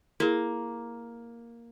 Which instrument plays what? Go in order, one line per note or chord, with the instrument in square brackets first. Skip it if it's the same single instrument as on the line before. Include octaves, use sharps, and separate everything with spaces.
[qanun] A#3 [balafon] E4 G#4